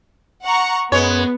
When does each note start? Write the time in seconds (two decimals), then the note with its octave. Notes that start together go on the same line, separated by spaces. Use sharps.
0.44 F#5 A#5 C#6
0.92 F#2 G#3 B3 C#5